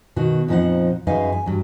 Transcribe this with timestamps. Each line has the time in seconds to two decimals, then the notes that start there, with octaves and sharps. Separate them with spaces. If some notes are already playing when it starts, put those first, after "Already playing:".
0.16 B2 D#3 F#4
0.48 F2 A#2 F3 D#4 C5 F#5
1.07 F#2 D#4 G#4 B4 F5 G#5
1.32 G#5
1.46 G2 F#3